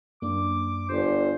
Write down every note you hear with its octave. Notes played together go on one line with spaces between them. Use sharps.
F#2 A#3 D4 D6
G1 C5